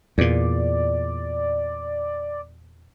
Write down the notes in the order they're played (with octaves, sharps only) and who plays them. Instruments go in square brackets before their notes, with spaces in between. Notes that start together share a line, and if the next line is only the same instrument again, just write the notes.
[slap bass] E2 A#2 [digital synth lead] D5